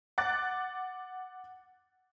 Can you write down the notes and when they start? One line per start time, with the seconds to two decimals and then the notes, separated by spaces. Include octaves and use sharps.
0.18 F#5 D6 F#6 A6